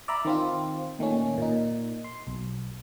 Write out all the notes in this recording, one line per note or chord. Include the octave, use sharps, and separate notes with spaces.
D5 E5 A#5 B5
D#3 C4 F4
A#2 D#3 A3 C#4
A#2 D#4
C6
B1